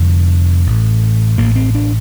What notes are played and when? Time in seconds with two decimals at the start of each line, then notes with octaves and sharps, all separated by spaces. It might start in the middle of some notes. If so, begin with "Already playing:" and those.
Already playing: F1 F2 D3 A3
0.65 A1 A2
1.38 A1 A2 A#3
1.56 C4
1.75 D4